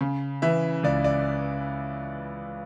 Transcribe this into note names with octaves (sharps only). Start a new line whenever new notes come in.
C#3
E3 E5
C#2 D5
D5